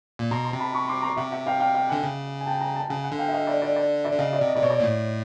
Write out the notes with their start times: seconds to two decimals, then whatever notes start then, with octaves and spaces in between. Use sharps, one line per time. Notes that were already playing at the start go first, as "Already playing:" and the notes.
0.19 A#2
0.31 B2 A#5 C6
0.45 A#5 C6
0.53 C3
0.59 A5 B5
0.74 B5 C#6
0.88 C6 D6
1.02 A#5 C6
1.16 C3 E5 F#5
1.31 E5 F#5
1.46 F5 G5
1.60 F5 G5
1.74 F5 G5
1.89 D3 F#5 G#5
2.03 C#3
2.41 G#5
2.46 G5 A5
2.60 G#5 A#5
2.75 G5 A5
2.89 C#3 F#5 G#5
3.04 F#5 G#5
3.12 D3
3.18 F5 G5
3.28 E5
3.32 D#5 F5
3.47 D5 E5
3.62 D5
3.76 D5
4.04 D5 E5
4.11 D3
4.18 C#3 D#5 F5
4.33 D5 E5
4.41 C3
4.47 D#5
4.56 C3 D5
4.62 B2 C#5
4.70 D5
4.80 A#2
4.84 A2